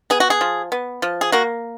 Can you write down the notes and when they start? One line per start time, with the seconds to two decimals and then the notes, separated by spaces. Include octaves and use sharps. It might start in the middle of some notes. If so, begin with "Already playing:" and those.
0.10 B3 G#4
0.20 F#4
0.30 G#4
0.41 F3
0.72 B3
1.02 F3
1.21 G#4
1.32 A#3 F#4